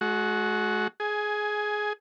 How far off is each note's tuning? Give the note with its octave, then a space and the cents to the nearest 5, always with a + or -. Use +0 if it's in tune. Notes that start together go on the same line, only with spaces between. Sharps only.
G#3 +45 F#4 +0
G#4 +15 G#5 +0